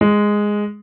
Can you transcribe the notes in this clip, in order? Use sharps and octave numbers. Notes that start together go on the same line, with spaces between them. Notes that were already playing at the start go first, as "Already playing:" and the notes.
G#3